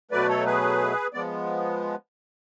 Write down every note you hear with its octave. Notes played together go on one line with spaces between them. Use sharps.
B2 F#3 A3 B4 D5
A4 C#5
G#4 B4
F3 G#3 B3 D5